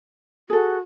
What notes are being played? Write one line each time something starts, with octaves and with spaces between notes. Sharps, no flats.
F#4 G#4 A4